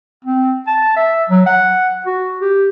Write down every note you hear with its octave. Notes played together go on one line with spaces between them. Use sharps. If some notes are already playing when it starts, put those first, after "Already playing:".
C4
A5
E5
F#3
F#5
F#4
G4